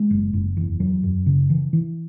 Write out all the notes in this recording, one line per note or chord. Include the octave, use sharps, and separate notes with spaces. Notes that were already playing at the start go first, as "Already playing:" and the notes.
Already playing: G#3
F#1
F#1
E2
F#3
F#2
C#3
E3
E3